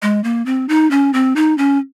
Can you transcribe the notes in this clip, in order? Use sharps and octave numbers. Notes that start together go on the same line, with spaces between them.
G#3
A#3
C4
D#4
C#4
C4
D#4
C#4